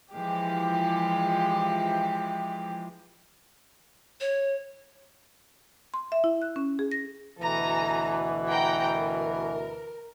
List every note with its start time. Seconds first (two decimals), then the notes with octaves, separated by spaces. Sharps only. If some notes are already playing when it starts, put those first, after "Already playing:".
0.12 E3 F3 G#3 G4
4.21 C#5
5.94 C6
6.12 E5
6.24 E4
6.42 F#6
6.56 C#4
6.79 G#4
6.91 A#6
7.40 D2 B2 E3 A4 G#5 A#5
8.48 F#5 G5 A#5
8.92 A#4